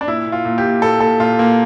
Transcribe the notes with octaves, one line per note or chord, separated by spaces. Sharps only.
D4
A#2 E4
A#2
F4
A#2
G4
A#2
A#2 A4
A#2 A4
A#2 F4
A#2 A#3